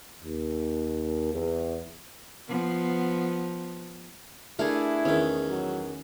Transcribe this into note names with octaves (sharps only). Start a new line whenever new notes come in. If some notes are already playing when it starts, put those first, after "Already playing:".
D#2
E2
F3 B3
A3 D4 E4 G#4 A#4
E2 D#3 C#4
F#3